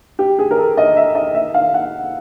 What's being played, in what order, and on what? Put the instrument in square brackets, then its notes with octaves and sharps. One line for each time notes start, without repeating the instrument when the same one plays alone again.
[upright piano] G4
G#4
A#4
A4
D#5
E5
D#5
E5
F5
F#5